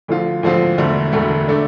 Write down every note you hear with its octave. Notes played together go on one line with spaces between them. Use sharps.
D2 D3 F3 C4 F4
D2 D3 F3 C4 F4
E1 D2 D3 A3
E1 D2 D3 A3
D3 A3 D4